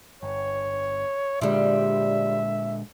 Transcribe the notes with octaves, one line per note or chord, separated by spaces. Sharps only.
G1 C#5
A#2 D3 F3 G3 G#3 E5